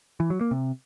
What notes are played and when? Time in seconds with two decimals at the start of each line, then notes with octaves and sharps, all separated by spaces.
0.20 E3
0.30 F#3
0.41 A#3
0.51 C3